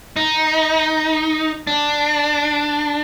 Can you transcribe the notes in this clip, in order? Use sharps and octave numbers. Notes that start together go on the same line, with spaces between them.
D#4
D4